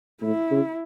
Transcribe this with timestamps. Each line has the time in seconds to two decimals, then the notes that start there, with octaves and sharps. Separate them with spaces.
0.22 A2 E4
0.51 C#3